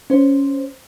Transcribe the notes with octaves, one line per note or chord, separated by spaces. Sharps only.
C#4 C5